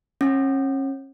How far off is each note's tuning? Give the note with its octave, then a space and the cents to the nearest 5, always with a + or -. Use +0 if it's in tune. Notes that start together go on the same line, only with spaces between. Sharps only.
C#4 -35